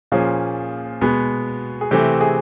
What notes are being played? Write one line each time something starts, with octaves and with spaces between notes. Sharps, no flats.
A#2 F3 A#3 C#4 G#4
B2 G#3 B3
G#4
C3 E3 A3 C4 G4
G#4